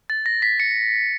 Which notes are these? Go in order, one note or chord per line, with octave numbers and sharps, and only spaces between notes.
A6
A#6
B6
C#7